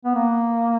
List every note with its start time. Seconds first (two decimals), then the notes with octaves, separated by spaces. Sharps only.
0.05 B3
0.15 A#3